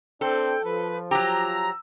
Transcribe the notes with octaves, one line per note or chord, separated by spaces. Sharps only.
C4 D4 A4 C5 G5
F3 B4
F#3 G4 A#5 E6